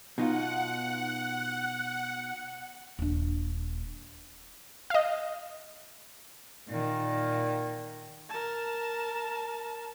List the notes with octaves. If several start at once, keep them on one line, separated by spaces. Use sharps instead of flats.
B2 D#4 F4 F#5
D#1 D4
D#5 F5
A#2 D#3
A#4 A5